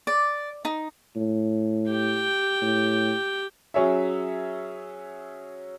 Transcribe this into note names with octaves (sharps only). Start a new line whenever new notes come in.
D5
D#4
A2
G4 G5
A2
F#3 C#4 G#4 C#5 E5